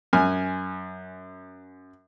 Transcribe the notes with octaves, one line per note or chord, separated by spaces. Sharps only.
F#2 G#5 F6